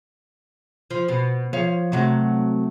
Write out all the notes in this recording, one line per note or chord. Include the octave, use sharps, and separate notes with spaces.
F3
B2
F3 C#5 F5
C3 F#3 A3